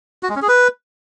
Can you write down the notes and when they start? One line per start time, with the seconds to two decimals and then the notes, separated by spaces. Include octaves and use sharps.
0.23 F#4
0.29 G#3
0.36 C#4
0.42 G#4
0.48 B4